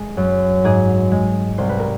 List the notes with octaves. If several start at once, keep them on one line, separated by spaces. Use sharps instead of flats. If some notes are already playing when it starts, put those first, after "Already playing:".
Already playing: G#3 G#4
F#2
G#2 G#4
G#3
C2 C5
B4
A#4